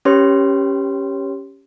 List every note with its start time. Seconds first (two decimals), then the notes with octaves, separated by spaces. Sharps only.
0.05 C#4 G4 B4 C#5 C6